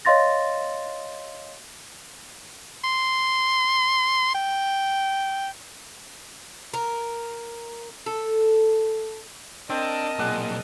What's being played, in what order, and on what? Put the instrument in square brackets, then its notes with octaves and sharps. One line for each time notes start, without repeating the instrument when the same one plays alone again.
[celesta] C#5 D#5 F5 C6 A6 A#6
[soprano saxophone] C6
G5
[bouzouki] A#4
A4
[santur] C4 [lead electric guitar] D4 [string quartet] A#4 D#5 A5
[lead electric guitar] B1 A#2 [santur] G#3 D5 F#5